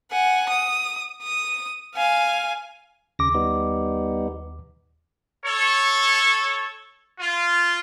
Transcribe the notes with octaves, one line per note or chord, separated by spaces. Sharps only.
F#5 G#5
D#6
D#6
F5 G#5
D#2 C#3 D6 A#6
G3 B3 D#4
A4 C#5
F4